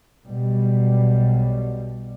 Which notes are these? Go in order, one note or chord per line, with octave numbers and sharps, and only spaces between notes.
B1 B2 G3